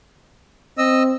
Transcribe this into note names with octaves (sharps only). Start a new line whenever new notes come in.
C4 D#5 E6